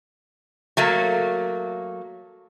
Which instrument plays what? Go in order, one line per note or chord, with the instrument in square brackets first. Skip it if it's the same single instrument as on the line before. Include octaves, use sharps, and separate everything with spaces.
[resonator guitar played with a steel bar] F#3 A3 A#3